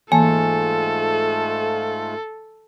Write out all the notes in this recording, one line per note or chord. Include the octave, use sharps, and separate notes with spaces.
G#2 E3 A3 A#3 F4 A4 G#5 A5